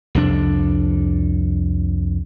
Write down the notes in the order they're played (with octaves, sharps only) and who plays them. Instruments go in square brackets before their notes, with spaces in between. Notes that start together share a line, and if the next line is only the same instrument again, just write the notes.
[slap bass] C2 F2 D4